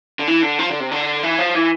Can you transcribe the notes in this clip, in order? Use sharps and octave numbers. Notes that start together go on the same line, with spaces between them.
D3
E3
D3
F3
D3
C3
D3
E3
F3
E3